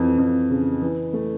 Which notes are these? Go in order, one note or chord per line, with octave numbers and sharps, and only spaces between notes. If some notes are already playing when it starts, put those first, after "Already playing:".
Already playing: F2 E3
F2
C#3
E3
A3